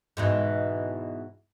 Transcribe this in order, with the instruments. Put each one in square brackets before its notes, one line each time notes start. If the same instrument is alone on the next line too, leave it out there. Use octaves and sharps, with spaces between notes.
[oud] G#2 B2 E3